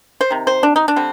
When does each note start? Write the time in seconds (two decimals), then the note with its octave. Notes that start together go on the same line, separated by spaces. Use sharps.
0.21 C5
0.31 C3 D#3
0.47 C5
0.63 D4
0.76 D#4
0.88 D4
0.96 D3 G3 C4